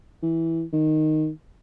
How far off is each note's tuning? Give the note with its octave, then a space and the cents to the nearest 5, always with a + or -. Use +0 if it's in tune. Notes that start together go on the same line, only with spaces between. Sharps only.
E3 -5
D#3 -5